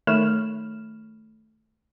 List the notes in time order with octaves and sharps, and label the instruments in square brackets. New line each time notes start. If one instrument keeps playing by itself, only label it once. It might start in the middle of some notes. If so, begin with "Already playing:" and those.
[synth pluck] D#3 A3 C#5 B5 F6 E7